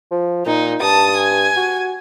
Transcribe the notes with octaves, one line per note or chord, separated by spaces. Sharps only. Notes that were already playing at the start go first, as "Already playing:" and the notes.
F3
A#2 D#4
G2 A5 D#6
G#5
F#4